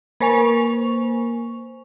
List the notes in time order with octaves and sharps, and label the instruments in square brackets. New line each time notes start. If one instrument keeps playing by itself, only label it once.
[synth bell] A#3 A#4 C5 G#5 C#6 F7